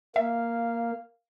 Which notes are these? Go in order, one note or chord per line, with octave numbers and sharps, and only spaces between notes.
A#3 E5 F5